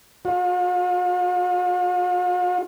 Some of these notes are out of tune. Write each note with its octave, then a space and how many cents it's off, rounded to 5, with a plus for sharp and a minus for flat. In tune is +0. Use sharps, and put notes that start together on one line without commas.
F4 +45